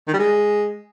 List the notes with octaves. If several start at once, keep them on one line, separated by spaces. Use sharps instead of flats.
D#3
G3
G#3